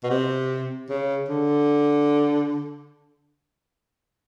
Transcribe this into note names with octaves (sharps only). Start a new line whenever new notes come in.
B2
C3
C#3
D3